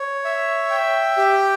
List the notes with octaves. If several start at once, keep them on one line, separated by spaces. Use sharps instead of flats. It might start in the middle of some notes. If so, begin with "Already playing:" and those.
Already playing: C#5
E5
G5
G4